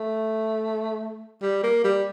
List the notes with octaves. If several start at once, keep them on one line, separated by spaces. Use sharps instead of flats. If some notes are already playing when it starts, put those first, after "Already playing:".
Already playing: A3
G3
A#3
G3